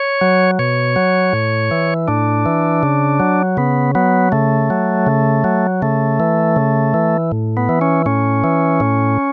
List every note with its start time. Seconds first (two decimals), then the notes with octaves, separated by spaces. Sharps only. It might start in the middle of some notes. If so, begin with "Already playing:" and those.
Already playing: C#5
0.21 F#3
0.59 B2 C#5
0.96 F#3
1.33 A2
1.71 E3
2.08 A2 D4
2.46 E3
2.83 C#3
3.20 F#3
3.57 C#3 B3
3.95 F#3 B3
4.32 C#3 A3
4.70 F#3
5.06 C#3
5.44 F#3
5.82 C#3 A3
6.20 E3
6.56 C#3
6.94 E3
7.32 A2
7.57 B3
7.69 E3
7.81 C#4
8.06 A2 C#4
8.44 E3
8.80 A2